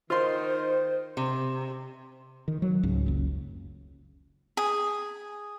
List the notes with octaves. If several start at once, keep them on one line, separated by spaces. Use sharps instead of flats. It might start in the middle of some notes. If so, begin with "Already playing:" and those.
D#3 F4 C5 C6
C3
D#3
F#3
C#2 G#2
F#1 C#2
G#4